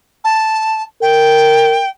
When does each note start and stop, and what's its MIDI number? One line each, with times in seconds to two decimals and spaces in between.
0.24 0.83 81
1.02 1.81 70
1.02 1.89 79